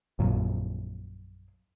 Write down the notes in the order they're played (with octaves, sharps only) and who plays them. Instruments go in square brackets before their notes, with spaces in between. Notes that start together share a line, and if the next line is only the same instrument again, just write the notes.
[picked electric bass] A#1 F#2 A#2 F#3